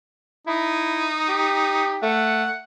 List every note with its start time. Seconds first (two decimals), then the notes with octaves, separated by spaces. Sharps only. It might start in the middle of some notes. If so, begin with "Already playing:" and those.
0.47 D#4 E4
1.29 G4
2.03 A3 F#5